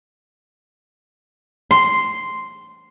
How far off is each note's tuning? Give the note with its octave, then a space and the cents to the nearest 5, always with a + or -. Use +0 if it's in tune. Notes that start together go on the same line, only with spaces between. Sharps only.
C6 -5